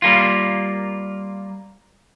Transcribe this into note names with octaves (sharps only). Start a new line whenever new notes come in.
G3 A#3 F4